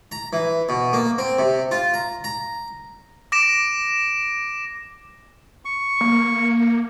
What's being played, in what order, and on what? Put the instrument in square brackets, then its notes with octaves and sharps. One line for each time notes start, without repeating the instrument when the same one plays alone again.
[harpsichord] A#5
E3
B2
A#3
C4
C3
F4
A#5
A#5
[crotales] D6 A#6 D7 E7
[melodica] C#6
[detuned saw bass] A#3
A#3